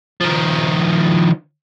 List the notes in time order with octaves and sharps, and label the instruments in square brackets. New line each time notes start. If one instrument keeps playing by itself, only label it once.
[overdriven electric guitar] D#3 F3